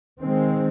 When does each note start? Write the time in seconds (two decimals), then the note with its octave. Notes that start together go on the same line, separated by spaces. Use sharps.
0.19 D#3 G#3 C4